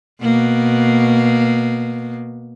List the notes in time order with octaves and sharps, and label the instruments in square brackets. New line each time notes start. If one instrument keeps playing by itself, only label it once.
[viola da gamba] B2 A#3